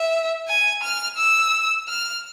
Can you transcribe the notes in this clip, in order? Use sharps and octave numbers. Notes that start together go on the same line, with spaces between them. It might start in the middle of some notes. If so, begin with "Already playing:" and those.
Already playing: E5
G#5
F6
E6
F6